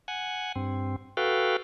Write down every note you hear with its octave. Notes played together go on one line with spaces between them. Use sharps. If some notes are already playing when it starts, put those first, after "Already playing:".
F#5 G#5
G2 C4
F#4 A4 B4 F5 G5